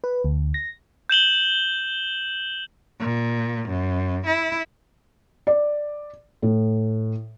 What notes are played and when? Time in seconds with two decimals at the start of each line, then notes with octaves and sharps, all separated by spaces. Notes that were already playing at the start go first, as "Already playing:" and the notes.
0.04 B4
0.24 D2
0.54 A#6
1.09 G6 E7 F#7 G7
3.00 A#2
3.69 F#2
4.27 E4
5.47 D5
6.42 A2